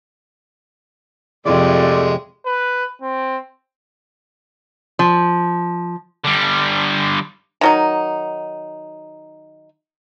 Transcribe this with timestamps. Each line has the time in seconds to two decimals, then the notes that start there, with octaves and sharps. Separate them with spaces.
1.46 F2 C3 G#3 A3 D5
2.45 B4
3.02 C4
4.99 F3
6.24 D3 G3
7.61 D#3 F#3 D#4